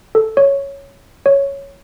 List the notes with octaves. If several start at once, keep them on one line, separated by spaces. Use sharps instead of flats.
A4
C#5
C#5